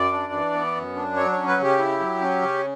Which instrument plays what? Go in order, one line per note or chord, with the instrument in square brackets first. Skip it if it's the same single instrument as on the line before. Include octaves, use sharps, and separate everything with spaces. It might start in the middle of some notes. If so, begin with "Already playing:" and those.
Already playing: [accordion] F#2 D5
D4
E3
B3
F#2
D4
F#3 C#5
C#5
C#4
B4
C#3 G4
E4
F#3
C#4
C#3